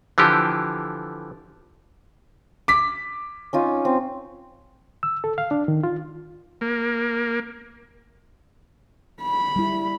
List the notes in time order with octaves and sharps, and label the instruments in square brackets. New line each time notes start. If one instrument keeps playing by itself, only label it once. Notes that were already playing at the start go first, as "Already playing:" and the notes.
[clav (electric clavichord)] D3 E3 F3 G4
[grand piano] D6 B6
[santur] C#4 D#4 F4
C4
[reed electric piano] E6
A4
F5
D4
D#3
F4
[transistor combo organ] A#3
[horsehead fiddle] B5
[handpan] G3 E4